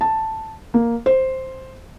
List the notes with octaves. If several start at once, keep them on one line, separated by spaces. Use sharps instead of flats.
A5
A#3
C5